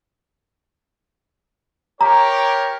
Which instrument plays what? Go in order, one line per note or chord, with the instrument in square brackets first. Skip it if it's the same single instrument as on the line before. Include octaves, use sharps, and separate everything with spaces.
[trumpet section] G4 A#4 C#5 [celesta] A#5